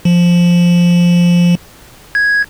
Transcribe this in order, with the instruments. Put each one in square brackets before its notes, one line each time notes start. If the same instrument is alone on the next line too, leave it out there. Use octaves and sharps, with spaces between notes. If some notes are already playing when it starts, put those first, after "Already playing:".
[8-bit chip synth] F3
G#6